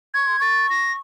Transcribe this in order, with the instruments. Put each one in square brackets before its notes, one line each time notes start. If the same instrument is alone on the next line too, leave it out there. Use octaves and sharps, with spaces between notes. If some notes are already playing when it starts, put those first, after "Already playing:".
[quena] C#6 [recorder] G#6
[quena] C6
[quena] C#6 [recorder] A6
[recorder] A#6